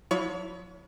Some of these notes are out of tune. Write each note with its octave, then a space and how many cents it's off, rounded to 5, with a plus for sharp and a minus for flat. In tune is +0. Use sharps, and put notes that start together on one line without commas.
F#3 -45 E4 +0 C#5 +35